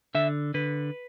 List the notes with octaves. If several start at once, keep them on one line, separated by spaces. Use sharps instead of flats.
D3 E5
D3 B4